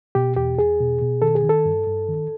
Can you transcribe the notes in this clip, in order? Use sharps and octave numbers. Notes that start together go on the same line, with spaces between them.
B2 G4
E2 G4
E2 G#4
B2
B2
D#3 A4
G#4
D#3
A4
G2
G2
D#3